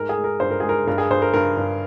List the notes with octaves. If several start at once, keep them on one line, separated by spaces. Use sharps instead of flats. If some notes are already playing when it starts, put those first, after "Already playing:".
Already playing: G#2 G#3 A#4
G#4
G#3
A#4
G2 C5
A#4
G#3 G#4
A#4
G2 A#4
G#4
G2 C5
A#4
G2 A#4
G2